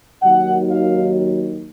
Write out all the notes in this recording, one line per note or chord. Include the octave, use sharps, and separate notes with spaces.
D#2 D#3 F#3 F#5
F5